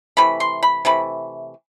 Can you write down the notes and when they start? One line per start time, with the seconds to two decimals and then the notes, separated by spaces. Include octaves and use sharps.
0.17 C3 E3 A3 B5
0.40 C6
0.63 B5
0.85 C3 E3 A3 B5